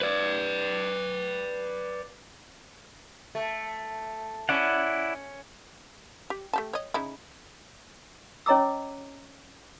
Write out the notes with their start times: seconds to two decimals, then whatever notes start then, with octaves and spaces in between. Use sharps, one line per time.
0.02 B4 D5
3.35 A3
4.49 C#4 E4 D5 F#5
6.30 G4
6.53 A3 G4 A5
6.73 C#5 D#5
6.94 C#3 D#4 E4
8.46 C#4 C#5 D#5 A#5 D6 E6